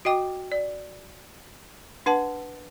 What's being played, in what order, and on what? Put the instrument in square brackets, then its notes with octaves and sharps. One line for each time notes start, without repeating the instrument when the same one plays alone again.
[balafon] F#4 D#5 G5 D6
D5
D4 B4 F#5 A5